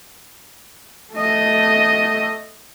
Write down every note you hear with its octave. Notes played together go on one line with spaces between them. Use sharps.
A3 D#5